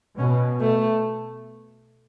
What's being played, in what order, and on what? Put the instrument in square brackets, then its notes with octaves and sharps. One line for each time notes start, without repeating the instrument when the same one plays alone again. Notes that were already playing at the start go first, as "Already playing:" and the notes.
[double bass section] B2 [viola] C#4
[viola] A3